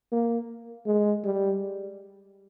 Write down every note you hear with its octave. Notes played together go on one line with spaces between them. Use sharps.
A#3
G#3
G3